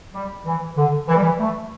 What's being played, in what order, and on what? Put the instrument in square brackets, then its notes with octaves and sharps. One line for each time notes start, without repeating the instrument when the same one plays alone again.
[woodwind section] G3
E3
D3
E3
G3
E3
A3